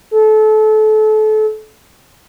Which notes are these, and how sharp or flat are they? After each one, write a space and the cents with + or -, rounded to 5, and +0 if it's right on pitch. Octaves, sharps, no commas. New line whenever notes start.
A4 -30